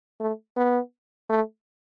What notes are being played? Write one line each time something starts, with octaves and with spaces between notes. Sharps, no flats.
A3
B3
A3